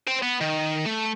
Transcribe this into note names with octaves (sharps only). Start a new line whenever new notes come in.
C5 G5
B3
D#3
A3